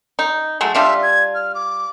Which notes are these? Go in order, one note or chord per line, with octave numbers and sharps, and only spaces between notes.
D#4
F#3 G#3 A3
G3 D4 F4 E5
G#6
F6
D6